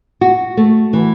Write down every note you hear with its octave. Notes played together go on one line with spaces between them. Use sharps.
F#4
A3
E3